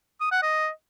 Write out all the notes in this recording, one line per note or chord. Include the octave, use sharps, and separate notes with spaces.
D#6
F#5
D#5